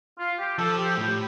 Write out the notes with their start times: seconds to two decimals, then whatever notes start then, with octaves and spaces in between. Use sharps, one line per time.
0.19 F4
0.39 G4
0.58 F3 A4
0.78 G4
0.97 A2 G4